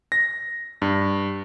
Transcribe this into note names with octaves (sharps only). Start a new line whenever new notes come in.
A#6
G2